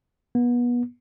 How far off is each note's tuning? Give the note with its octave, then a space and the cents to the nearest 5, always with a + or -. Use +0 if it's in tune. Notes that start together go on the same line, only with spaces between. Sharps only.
B3 -30